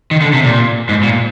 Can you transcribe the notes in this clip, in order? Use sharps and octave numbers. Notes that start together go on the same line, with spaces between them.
D#3
D3
C3
A#2
G#2
A#2